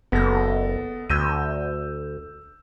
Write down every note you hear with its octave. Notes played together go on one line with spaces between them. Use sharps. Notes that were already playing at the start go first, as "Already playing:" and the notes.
F#1 B3 A4 A#6
D2 E6 G6 D#7